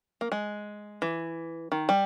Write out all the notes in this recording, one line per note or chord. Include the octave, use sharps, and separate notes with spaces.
A#3
G#3
E3
D#3
G3